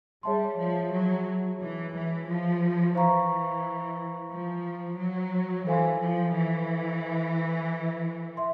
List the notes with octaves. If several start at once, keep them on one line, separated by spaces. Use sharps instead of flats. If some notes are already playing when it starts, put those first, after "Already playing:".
G3 G#4 C#5 E5 A5 C6
F3
F#3
E3
E3
F3
E3 C5 F5 A#5 C#6
F3
F#3
E3 A4 C5 F5 G#5 C6
F3
E3
E5 C6